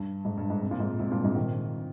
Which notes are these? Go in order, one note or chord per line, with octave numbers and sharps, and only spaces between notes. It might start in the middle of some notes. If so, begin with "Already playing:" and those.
Already playing: G2
G#2
G2
G#2
C3
A#2
G#2 C3
G#2 C3
G2 A#2
G#2 C3
C3 D#3